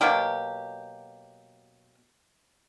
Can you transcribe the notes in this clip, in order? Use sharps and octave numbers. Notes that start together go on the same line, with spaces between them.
B2 F#3 A#3 G4